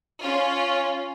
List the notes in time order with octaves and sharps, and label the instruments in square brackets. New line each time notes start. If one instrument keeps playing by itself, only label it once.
[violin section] C#4 F4